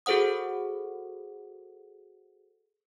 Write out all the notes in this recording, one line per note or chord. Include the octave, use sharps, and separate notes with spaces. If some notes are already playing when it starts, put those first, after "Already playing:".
F#4 G#4 A4 C5 F#5 D#6